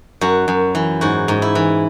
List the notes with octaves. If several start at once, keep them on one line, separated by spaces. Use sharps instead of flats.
F#2 F#4
F#2
E3
G#2 F#4
G#2
E4
E3